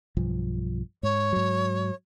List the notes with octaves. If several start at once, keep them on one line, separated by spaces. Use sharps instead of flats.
B1 G2 F3
G#2 C#5
G#2 F#3